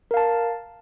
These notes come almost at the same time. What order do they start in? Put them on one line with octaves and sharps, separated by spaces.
A#4 F5 A5